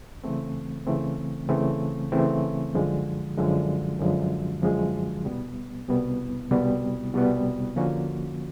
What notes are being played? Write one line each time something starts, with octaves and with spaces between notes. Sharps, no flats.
C#3 E3 A3 C4
C#3 E3 A3 C4
C#3 E3 A3 C4
C#3 E3 A3 C4
F#2 D3 F3 G#3
F#2 D3 F3 G#3
F#2 D3 F3 G#3
F#2 D3 F3 G#3
C2 B2 G3 B3
C2 B2 G3 B3
C2 B2 G3 B3
C2 B2 G3 B3
D3 F3 A#3 C#4 F#4